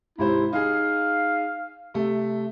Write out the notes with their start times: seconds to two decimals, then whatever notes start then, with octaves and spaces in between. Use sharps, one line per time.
0.18 G#2 C3 E4 C5
0.53 D#4 G#4 F5
1.94 C3 A3